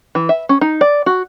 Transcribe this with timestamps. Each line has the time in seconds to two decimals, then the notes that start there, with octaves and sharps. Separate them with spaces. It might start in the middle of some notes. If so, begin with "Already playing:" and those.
0.15 E3
0.29 E5
0.49 C#4
0.61 D#4
0.81 D5
1.06 F#4